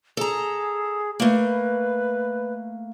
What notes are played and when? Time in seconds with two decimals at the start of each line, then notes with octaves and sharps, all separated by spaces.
0.17 G#4 A4 A#5
1.20 A3 A#3 B4